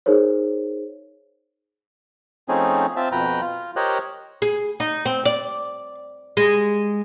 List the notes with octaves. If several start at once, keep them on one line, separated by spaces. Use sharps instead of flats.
D#4 G#4 A#4 C5 C#5
F3 A3 C4 C#4 D#4 G#4
C4 F4 E5 A5
F2 B2 B4 G5 A#5
F4
G4 A#4 C5 C#5 D#5 F#6
G#4
D#4
C4
D5
G#3